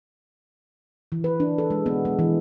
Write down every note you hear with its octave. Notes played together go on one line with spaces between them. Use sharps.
E3
B4
D4
A4
G#3
B3
G#3
E3